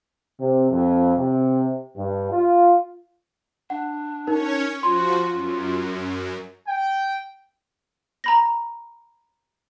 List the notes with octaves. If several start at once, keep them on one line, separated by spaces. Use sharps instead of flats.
C3
F2
C3
G2
F4
D4 F#5
C#4 D#4 A#4 C#5
F3 F4 F#4 C6
F#2
G5
A#5 B5 A#6